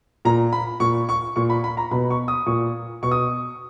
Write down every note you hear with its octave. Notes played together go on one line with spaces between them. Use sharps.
A#2 A#5
B5
A#2 C#6
C#6
A#2 C#6
B5
B5
A#5
B2 B5
C#6
D#6
A#2 C#6
B2 C#6
D#6